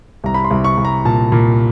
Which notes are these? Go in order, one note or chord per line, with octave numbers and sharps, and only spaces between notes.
C2 A#5
B5
C6
C2
C#6
C2
A#5
A#2 A5
A#2